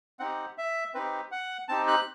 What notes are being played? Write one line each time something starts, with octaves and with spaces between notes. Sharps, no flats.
C4 D#4 G4 F#5
E5
C4 D#4 G4 B4
F#5
C4 D#4 G4 A5
F#6